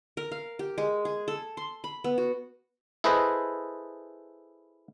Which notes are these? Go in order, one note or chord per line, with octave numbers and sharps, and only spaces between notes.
A#4
F5
G4
G#3
G#4
A4
C6
B5
B3
F#4
E4 G#4 A4 B4 C5 D#5